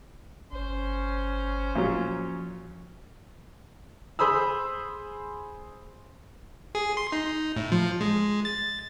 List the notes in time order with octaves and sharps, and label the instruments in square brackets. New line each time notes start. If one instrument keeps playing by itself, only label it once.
[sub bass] G1 [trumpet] C#4 [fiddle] C5
[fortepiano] A#2 F#3 [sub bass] F3
[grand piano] G#4 C5 B5 D#6 E6
[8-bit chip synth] G#4
C6
D#4
A2
F3
G#3
A6